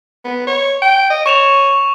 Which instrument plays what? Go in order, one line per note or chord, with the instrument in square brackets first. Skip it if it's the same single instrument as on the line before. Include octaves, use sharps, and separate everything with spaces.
[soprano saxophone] B3
C#5
G5
D#5
[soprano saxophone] C#5 [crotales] C#6 E7 F7